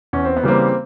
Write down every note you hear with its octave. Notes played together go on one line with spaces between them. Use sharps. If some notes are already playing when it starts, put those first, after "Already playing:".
E2 C#4
C4
B3
C#3 E3 G3 A#3 C4